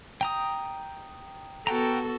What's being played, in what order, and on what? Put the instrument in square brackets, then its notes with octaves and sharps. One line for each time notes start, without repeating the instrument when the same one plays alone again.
[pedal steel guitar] G5 A#5 D#6
[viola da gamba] B3 F#4 A4 [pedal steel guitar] F#5 G5 A#5